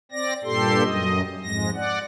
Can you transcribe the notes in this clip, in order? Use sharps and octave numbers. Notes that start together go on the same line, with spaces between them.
C4 D5 A#6
G2 A#2 G4 A4 C6
F#2 D#5
F2 G#2 G#3 A#6
D5 F#5